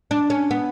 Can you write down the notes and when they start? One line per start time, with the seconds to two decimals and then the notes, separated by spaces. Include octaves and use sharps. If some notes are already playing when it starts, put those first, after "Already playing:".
0.11 D4
0.30 C#4
0.51 B3